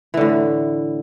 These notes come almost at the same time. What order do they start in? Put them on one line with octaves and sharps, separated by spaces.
E3 D3 A2